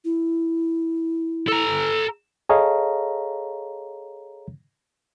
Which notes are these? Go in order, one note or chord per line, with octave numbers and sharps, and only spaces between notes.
E4
A4 A#5
G#4 A4 C#5 D#5 F5 A#5